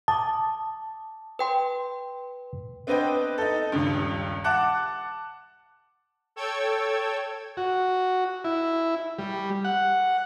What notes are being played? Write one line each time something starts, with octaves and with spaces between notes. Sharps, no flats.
A5 D6 D#6
B4 G5 C6
B3 C4 D4 B4 D#5 G5
D#4 A4
D#1 C#2 G2
F#5 A5 D6 F#6
A4 C#5 G5 E6 G#6
F#4
E4
G3
F#5